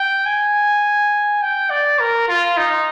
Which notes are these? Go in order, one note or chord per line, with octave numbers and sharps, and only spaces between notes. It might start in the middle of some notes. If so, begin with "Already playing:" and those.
Already playing: G5
G#5
G5
D5
A#4
F4
D#4